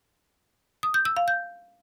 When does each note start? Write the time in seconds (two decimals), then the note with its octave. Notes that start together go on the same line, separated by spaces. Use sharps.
0.83 D#6
0.94 G6
1.05 E6
1.17 F5
1.28 G6